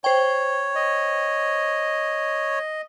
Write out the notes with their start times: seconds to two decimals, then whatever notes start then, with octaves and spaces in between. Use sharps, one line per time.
0.04 C5 C#5 G5
0.75 D#5